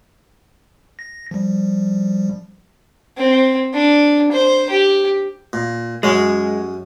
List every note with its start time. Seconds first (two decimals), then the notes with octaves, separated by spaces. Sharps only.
0.99 A#6
1.31 F3 G3
3.18 C4
3.73 D4
4.32 C5
4.70 G4
5.53 A#2
6.03 F#2 G#3 C#4